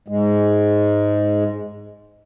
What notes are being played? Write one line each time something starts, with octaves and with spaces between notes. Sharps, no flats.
G#2 G#3